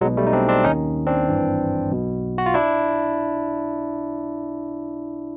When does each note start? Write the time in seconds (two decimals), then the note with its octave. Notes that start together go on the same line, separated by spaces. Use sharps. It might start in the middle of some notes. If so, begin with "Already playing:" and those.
0.01 B1 F#3 G#3
0.05 B2
0.17 G3 A3
0.27 D#4
0.33 C4 D4
0.49 C4 D4
0.64 D#2 D#3 C#4 D#4
1.07 C4 D4
1.28 G#1 G2 E3
1.91 B1 B2
2.38 F#4
2.46 F4
2.54 D4 E4